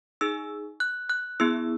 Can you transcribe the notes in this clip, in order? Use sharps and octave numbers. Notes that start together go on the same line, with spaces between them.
D#4 G#4 E6
F#6
F#6
B3 E4 G#4 E6